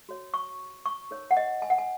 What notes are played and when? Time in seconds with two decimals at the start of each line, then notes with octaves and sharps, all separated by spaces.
0.09 F#4 C#5
0.34 C#6
0.86 C#6
1.11 D#4 A#4 C#5
1.31 F#5
1.37 D#5
1.62 G#5
1.70 F#5
1.78 G#5